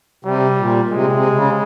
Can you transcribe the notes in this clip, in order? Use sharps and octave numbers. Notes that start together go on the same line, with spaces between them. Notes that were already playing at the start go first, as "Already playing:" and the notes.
C3 G3
A#2
C3 G#3
C3
C#3